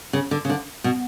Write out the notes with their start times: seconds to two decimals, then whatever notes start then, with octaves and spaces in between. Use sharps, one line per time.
0.13 C#3
0.31 D3
0.45 C#3
0.49 D3
0.84 B2